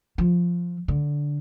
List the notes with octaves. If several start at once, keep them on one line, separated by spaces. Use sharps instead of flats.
F3
D3